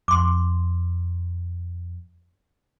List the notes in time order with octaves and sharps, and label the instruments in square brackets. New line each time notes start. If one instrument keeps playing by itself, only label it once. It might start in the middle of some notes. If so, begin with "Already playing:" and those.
[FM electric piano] F2 [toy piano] C6 D6